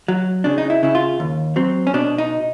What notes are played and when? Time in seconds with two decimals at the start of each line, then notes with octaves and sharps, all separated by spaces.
0.08 F#3
0.44 C#3 D4
0.58 D#4
0.70 E4
0.83 C#3 E4
0.95 F4
1.20 D#2
1.56 F#3 C4
1.87 C#4
1.94 B2 D4
2.18 D#4